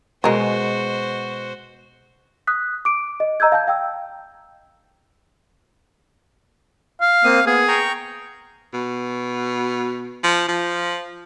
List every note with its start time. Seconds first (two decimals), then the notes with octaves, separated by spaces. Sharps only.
0.24 B2 G#3 F#4 G#4 A#4 C5
2.47 D#6 F#6 B6
2.85 D6 D7
3.20 D#5
3.40 D#5 A#5 E6 G6 G#6
3.52 F5 A5 G6
3.68 F5 G5 E6
7.01 F5
7.24 A#3 C4 D#6
7.47 B3 G#4
7.68 G5 A#5 C#6
8.73 B2
10.24 F3
10.48 F3